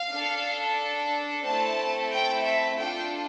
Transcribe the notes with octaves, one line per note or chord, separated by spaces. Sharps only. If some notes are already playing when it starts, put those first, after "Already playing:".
Already playing: F5
D4 A4
A3 C4 E4 A4 A5
G5
E5
D4 F4 A4 G5